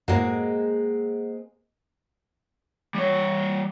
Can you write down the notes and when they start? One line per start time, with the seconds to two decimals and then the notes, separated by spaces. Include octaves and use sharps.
0.08 F#2 A2 G#3 A#3 C4 F#4
2.95 G3 C#5